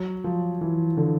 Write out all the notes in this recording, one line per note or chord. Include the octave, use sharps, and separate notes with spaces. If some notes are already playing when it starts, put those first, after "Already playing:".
Already playing: F#3
F3
E3
D3